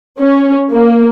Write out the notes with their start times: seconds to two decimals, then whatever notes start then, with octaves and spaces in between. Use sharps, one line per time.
0.19 C#4
0.71 A#3